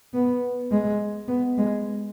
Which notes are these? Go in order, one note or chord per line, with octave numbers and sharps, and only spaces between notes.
B3
G#3
B3
G#3